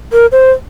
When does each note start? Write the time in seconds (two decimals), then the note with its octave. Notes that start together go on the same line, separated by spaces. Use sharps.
0.12 A#4
0.32 C5